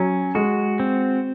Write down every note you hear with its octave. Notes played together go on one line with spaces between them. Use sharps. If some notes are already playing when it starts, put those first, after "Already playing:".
Already playing: F#3 C#4
G#3 F#4
C4